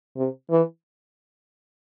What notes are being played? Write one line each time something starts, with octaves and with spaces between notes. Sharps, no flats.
C3
E3